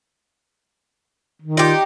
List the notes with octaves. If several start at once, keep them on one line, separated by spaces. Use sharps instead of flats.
D#3
D#4 F4 G4